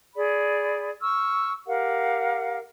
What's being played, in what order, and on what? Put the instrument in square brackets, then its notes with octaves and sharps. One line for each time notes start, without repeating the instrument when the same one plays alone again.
[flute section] G#4 D5 B5
C#6 E6 F6
G4 A#4 F5 F#5